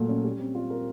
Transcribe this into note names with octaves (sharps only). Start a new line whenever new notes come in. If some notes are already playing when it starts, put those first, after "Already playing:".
Already playing: A#2 F#3 A3 A#3
C#4
G3
C4
F4
A#4